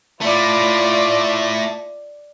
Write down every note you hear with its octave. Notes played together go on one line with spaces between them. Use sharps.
A3 E4 F4 D5